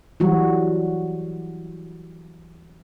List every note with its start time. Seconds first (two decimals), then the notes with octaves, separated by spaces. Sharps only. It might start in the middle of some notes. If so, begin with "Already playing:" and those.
0.20 E3 F#3 G3 F#4